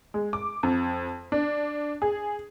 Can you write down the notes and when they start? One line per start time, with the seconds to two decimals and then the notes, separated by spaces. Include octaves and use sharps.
0.14 G#3
0.33 D6
0.63 F2
1.32 D4
2.02 G#4